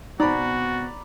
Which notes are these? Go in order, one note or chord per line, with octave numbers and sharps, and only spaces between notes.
B2 C4 D#4 F#4 D5 A#5 B5